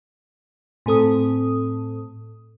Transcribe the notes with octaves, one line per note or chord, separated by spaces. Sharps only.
A2 C4 A4 D#6